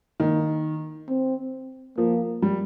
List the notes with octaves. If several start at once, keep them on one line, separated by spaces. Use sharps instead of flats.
D#3 A#3
C4
F3 A#3
G3